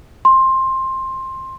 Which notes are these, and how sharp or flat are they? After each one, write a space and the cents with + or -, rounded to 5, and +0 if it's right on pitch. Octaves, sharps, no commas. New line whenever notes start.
C6 +15